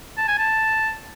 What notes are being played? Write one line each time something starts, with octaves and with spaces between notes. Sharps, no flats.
A5
G#5
A5